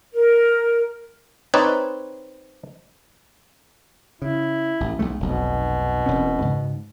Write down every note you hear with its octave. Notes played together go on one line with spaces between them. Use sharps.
A#4
C4 D#4 B4 C#5 D5
C#3 E4
A1
B1 G#3 A3
F1 B1 B2
E1 C4 C#4
G#2 C#3